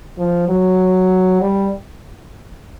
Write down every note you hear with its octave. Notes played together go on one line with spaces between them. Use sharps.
F3
F#3
G3